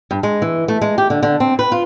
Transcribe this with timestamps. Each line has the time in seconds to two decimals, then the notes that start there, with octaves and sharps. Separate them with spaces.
0.11 G2
0.23 G#3
0.42 E3
0.68 A3
0.82 G#3
0.98 G4
1.10 D3
1.23 D3
1.40 C4
1.59 B4
1.72 F4